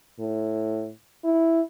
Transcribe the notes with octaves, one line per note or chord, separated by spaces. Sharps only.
A2
E4